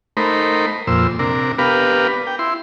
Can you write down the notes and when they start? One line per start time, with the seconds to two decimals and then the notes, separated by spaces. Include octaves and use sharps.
0.17 A3 D#4 A#4 C5 B5
0.87 F2 A#2 C5 E6
1.19 C3 D4 A#4
1.58 B3 D4 G4 A#4 B4 F5
2.27 G5
2.39 E4 C6